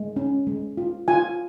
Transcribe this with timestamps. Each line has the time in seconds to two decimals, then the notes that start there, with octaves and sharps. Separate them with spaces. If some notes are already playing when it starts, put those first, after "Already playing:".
Already playing: G#3
0.16 C#4
0.47 G#3
0.77 F4
1.08 F4 G#5